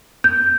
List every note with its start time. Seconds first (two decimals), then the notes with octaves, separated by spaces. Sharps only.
0.24 G6